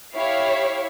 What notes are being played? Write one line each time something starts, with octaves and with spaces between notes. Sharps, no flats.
E4 G4 C#5 E5 F5